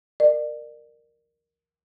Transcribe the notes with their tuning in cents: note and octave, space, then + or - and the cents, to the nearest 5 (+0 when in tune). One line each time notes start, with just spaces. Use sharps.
A#4 +0 D5 +30